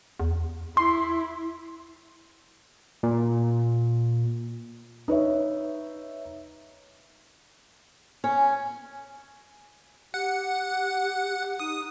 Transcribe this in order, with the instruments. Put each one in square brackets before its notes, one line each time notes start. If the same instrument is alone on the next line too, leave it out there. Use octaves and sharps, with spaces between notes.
[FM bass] E2
[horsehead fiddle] E4 [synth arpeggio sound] C6
[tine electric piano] A#2
[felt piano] D#4 B4 C#5 E5
[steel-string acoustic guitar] C#4
[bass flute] G4 [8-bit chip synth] F#5
[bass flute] D#4 [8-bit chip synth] D#6